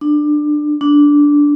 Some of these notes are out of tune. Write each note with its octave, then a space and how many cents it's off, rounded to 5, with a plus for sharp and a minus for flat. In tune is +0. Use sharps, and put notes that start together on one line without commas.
D4 +20
D4 -10